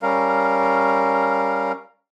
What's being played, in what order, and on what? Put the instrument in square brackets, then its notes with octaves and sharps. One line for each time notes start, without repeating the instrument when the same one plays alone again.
[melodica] G3 C#4 A#4 F5